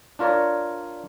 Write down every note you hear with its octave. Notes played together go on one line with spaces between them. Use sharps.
D4 F4 A#4 C#5 D5